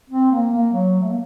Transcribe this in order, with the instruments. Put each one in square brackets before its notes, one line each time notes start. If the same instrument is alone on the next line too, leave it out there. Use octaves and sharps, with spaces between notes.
[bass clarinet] C4
A#3
A#3
F#3
A3
A#3